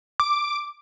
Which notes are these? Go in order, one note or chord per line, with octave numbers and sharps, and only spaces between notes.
D6